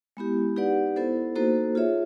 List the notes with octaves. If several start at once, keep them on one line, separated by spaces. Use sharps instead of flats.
G#3 B3 E4 G4
D#4 G4 B4 D5 F#5
B3 E4 A4 C5
A#3 D#4 F#4 A4 C5
F4 G#4 C#5 E5